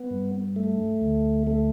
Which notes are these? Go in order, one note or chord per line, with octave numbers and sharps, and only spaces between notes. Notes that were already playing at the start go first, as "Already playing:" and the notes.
Already playing: B3
G2
A3
D2
A3